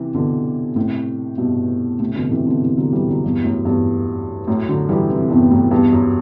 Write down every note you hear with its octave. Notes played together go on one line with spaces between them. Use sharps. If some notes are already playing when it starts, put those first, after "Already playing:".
Already playing: C3 E3
B2 D3
A2 C3
G2 B2
A2 C3
B2 D3
C3 E3
B2 D3
C3 E3
D3 F#3
E3 G3
D3 F#3
E2 G2
F#2 A2
E2 G2
F#2 A2
D3 F#3
E3 G3
C3 E3
E2 G2
F#2 A2
E2 G2
F#2